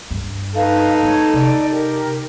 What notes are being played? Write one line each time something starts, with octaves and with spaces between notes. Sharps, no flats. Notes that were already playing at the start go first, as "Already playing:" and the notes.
G2
D#4 A4 B4 F5
A3 C#5
C3 D5
G4 A#4